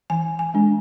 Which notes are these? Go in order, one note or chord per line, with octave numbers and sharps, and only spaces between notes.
E3 G#5
G#5
G#3 D4